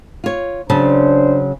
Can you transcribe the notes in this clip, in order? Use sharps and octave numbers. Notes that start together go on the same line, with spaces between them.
F4 C#5
C#3 F#3 C#4 D4 C5 A5